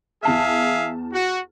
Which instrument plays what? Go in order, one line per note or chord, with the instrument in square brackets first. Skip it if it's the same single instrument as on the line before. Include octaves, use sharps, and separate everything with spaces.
[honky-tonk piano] E2 A5 F6 [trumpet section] G#4 E5 F5
[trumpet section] F#4